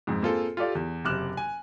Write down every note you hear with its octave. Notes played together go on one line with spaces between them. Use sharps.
F2 G#2
A#3 C4 F4 G#4 A4
F4 G4 A4 D5 F5
E2
F#1 C3 D6 F6 F#6 E7
G#5